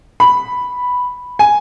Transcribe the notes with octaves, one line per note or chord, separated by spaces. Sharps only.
B5
G#5